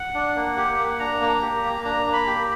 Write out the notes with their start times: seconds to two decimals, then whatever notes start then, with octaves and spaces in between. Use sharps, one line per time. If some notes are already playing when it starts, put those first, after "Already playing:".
Already playing: F#5
0.14 D4
0.36 A#3
0.57 G4
0.78 A#3
0.99 D4 A#5
1.21 A#3
1.42 G4
1.63 A#3
1.84 D4 A#5
2.06 A#3
2.13 B5
2.27 G4